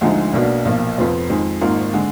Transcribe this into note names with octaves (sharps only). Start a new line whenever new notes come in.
D2 D3 F3 G#3 D#4
B1 B2 A#3 D4 F#4
B1 A#2 F3 A#3
F1 F2 F3 B3 F4
F2 D#3 G#3
G#1 G#2 D#3 A#3 F4
D3 G#3